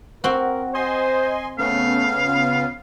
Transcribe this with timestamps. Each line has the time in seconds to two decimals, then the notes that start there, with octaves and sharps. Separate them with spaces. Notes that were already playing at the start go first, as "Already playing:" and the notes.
0.24 C4 F#4 A#4
0.75 C5 D#5 G#5 C6
1.59 C#3 A3 B3 C#4 F5
2.26 F4